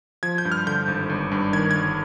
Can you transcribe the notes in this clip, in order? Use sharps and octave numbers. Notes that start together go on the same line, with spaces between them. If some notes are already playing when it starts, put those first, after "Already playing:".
F3 G#6
G6
G2
F6
D3 G6
G#1
G1
G2
D#3 G#6
G1 G#6